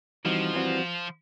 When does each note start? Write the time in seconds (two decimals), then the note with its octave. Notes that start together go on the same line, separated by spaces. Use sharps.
0.25 E3 F3 G3 C4 D#4 F#4
0.54 E3 G3 C4 D#4 F#4